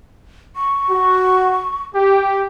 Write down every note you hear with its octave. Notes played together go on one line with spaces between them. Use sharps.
C#6
F#4
G4